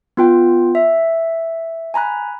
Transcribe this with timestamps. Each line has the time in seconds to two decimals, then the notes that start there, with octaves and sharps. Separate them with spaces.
0.17 B3 F4 G5
0.75 E5
1.94 G#5 A#5 B5 F#6